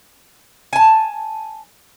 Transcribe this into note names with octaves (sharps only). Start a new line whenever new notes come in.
G#5 A5